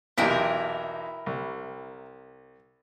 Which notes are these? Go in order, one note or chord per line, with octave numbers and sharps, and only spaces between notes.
B1 E2 C3 E4 A#4 G5
C2